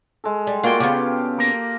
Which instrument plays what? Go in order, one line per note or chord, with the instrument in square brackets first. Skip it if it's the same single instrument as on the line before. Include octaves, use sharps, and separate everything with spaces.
[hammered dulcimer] G#3 A4
[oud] G3
[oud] A#3 [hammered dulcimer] F4 F#4 [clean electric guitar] G#4 D5 G5
[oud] C#3 B3 [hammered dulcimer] F4 G4
[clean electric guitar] A#3 A#4